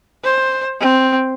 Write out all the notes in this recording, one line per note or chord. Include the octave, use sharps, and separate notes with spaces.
C5
C4